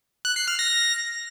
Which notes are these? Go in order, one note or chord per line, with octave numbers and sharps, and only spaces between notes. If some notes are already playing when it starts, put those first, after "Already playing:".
F#6
C7
F6
A#6